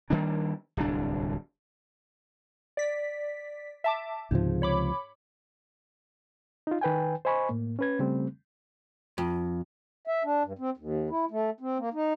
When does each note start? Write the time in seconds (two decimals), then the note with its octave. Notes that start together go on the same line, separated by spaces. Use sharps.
0.10 D#3 G3 A#3 D4
0.77 D1 C2 D4
2.77 D5 B6
3.84 E5 A5 D6
4.31 C#2 G#2 C3 F3
4.62 C#5 B5 D6
6.67 D#4 F4
6.81 D#3 B4 G5 G#5
7.25 C5 D#5 G#5 B5 C#6
7.49 A2 A#3
7.79 C#4 B4 G#6
7.99 C#3 G3 A3 C4
9.18 F2
10.07 E5
10.24 D4
10.43 G2
10.59 C4
10.77 D#2
11.10 E4
11.31 A3
11.60 C4
11.78 A#3
11.93 D#4